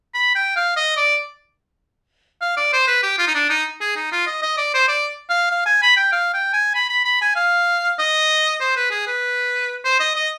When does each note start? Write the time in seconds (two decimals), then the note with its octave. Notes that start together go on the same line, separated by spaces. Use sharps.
0.14 B5
0.35 G5
0.56 F5
0.76 D#5
0.97 D5
2.41 F5
2.57 D5
2.73 C5
2.87 B4
3.03 G4
3.18 F4
3.27 D#4
3.35 D4
3.50 D#4
3.81 G#4
3.96 D#4
4.12 F4
4.27 D#5
4.42 D#5
4.58 D5
4.74 C5
4.88 D5
5.30 F5
5.51 F5
5.66 G#5
5.82 B5
5.97 G5
6.12 F5
6.34 G5
6.53 G#5
6.75 B5
6.89 B5
7.05 B5
7.22 G#5
7.36 F5
7.99 D#5
8.60 C5
8.76 B4
8.91 G#4
9.07 B4
9.84 C5
10.00 D#5
10.15 D#5